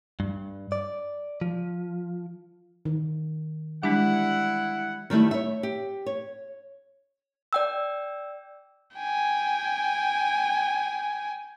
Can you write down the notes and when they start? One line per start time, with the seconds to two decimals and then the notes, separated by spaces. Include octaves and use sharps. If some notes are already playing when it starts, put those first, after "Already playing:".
0.20 G2
0.72 D5
1.41 F3
2.85 D#3
3.83 E3 G3 G#3 D4 E4 F#5
5.10 D#3 G3 A3 E4
5.31 C#5 E5
5.63 G4
6.06 C#5
7.53 D5 G5 E6
8.96 G5 G#5